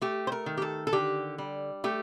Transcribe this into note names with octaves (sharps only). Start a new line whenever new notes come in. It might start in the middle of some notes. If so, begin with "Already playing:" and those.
A3 G4
C5
A#4
D#3
G4
A4
A4
D3 G4
G3
A3 G4